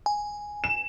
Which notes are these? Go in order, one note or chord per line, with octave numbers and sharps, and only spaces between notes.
G#5
E7